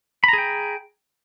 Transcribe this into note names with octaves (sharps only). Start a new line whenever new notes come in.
G#4 G5 A#5 B5